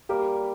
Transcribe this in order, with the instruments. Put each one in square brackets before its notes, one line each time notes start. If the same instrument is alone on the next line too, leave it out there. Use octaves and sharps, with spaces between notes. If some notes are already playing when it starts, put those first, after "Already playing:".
[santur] G3 A#3 [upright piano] G4